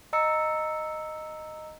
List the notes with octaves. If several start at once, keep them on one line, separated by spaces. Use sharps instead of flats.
D#5 A#5 E6 C#7